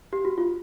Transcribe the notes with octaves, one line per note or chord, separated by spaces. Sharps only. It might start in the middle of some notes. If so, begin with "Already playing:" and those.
G4
F#4
F4